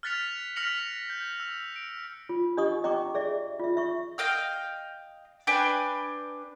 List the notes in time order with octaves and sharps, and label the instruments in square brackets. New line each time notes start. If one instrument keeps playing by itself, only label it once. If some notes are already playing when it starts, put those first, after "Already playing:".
[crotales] F6 F#6 A6 B6 C#7 F7
F6 A#6 B6 C#7 F7 F#7
G6
E6
D7
[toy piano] F4
D4 G4 D#5 F#5 C#6 D#6
D#5 G5 A#5 C#6 D6
G#4 D5 E5
F4 E5
E5 C#6
[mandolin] D#5 F5 G5 F6
D4 B4 G5 G#5